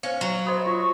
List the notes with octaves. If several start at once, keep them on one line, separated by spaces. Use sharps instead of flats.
C#4 C5 F5
F#3
C5 B5 C6 D#6
F4 C#6